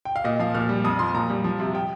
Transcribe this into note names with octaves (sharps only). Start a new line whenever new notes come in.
G5
F5
A#2 D#5
F3 F5
A#2 F6
G3
F2 D#6
F3 C6
A#2 A#5
G3
F3
C3
G5